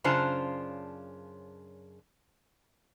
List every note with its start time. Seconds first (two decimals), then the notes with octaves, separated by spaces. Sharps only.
0.04 F#2 C#3 D4 F4 C5 A5